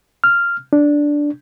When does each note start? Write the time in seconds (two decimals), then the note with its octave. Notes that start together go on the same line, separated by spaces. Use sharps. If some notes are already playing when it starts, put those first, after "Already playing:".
0.24 F6
0.73 D4